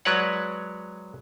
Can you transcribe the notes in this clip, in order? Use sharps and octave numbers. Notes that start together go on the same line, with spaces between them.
F#3 G#3 B4 C#5 D5 F#5